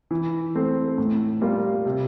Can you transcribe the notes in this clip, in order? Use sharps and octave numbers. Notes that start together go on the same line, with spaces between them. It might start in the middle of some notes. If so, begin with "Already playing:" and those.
E3
A3 C4
A2
G3 A#3 F4
C3